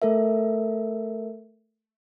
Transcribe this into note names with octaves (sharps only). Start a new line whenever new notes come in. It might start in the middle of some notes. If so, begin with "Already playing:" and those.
A3 A4 A#4 E5